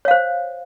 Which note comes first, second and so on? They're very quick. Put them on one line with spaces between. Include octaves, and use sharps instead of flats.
C#5 F5 C5